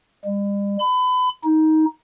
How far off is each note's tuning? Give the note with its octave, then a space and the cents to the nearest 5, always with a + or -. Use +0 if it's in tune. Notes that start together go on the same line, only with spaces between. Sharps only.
G3 +45
B5 +30
D#4 +15